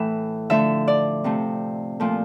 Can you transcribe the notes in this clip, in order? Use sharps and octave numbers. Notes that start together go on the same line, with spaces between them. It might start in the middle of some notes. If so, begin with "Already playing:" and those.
Already playing: A2 E3 A3 E5
D3 F3 A3 E5
D5
C3 F3 A3
A#2 F3 A3